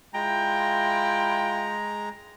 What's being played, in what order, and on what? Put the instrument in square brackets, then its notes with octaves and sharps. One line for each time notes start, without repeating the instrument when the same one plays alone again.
[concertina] G#3 A#5 [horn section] E4 F4 G5